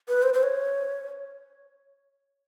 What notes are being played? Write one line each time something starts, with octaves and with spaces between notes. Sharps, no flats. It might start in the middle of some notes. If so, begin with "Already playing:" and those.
B4
C5
C5
C#5